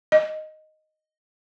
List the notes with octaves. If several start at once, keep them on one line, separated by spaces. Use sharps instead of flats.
D#5